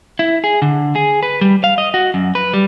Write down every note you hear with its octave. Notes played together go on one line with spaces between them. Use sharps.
E4
G#4
D3
G#4
B4
G3
F5
D#5
F#4
F#2
B4
G3